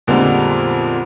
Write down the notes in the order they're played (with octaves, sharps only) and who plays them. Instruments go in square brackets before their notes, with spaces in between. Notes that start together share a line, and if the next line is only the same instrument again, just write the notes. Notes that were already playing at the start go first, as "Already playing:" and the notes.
[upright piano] F2 A#2 D3 G3 G#3 B3